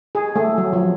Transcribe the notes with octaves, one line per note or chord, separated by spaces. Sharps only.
G#4
A3
F#3
F3